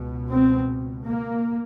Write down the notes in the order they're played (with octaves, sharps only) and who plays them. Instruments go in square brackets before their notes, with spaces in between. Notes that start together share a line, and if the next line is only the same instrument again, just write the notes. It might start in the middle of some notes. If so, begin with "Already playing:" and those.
Already playing: [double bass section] C#2 B2
C4
A#3